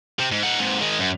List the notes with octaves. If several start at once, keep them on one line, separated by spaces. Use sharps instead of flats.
C3 C4
G#2
D#4 F#5
G#2 C3
D#3 G#3
F#2